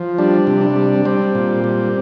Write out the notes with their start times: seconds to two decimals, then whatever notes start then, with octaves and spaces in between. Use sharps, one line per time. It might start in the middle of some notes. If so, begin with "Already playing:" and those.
Already playing: F3
0.18 G3 D4
0.47 C3
0.61 D4
0.76 G3
1.05 G3 C4
1.35 A#2
1.64 G3